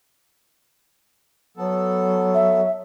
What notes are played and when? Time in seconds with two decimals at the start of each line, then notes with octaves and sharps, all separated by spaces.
1.57 F#3 B3 A4
2.34 E5